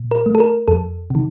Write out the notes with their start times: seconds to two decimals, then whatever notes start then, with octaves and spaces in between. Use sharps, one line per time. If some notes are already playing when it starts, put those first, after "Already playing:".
Already playing: A#2
0.11 A#4
0.26 A3
0.35 A4
0.40 A#4
0.68 F2 A4
1.10 C3 D#3